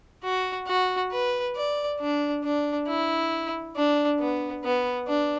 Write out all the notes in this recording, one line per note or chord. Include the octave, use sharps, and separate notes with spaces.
F#4
F#4
B4
D5
D4
D4
E4
D4
B3
B3
D4